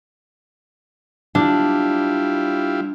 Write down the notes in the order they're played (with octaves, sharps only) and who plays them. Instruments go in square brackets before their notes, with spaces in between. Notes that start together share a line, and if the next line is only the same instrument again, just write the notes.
[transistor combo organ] G3 E4 F4 [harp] D4